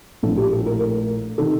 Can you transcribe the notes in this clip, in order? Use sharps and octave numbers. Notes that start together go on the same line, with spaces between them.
A#1 A2 F3 A4
G4
A4
A#4
A#4
C3 D#3 A4